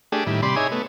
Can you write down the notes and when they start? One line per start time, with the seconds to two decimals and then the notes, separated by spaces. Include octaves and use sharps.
0.12 A3 D4 G4 G#4
0.27 A2 D#3 G3 E4
0.42 C3 G3 D5 B5 C6
0.56 D#4 G#4 C#5 E5 G#5
0.72 A3 B3